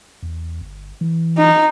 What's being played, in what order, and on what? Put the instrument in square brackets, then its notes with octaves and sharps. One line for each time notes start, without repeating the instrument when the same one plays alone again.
[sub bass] E2
G1
E3
[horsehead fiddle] D#4